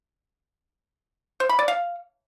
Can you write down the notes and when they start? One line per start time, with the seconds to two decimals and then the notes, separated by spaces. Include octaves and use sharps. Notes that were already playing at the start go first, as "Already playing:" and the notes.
1.40 C5
1.49 B5
1.59 D5
1.68 F5